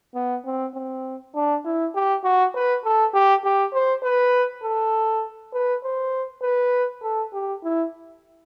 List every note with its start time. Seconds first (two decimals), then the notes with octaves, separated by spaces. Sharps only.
0.15 B3
0.45 C4
0.74 C4
1.35 D4
1.65 E4
1.95 G4
2.24 F#4
2.55 B4
2.84 A4
3.14 G4
3.44 G4
3.73 C5
4.03 B4
4.63 A4
5.54 B4
5.84 C5
6.43 B4
7.03 A4
7.33 G4
7.63 E4